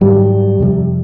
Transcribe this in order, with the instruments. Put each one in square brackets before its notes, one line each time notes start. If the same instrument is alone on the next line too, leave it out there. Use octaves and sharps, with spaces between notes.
[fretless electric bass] G#2 D#3 F#3 [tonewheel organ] G3
[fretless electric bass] F2 C3 F3